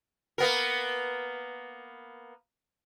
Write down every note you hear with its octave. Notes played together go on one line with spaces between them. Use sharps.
A#3 B3 A#4